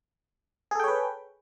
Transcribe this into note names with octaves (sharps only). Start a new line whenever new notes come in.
G#4 A4 B4 C#5 G5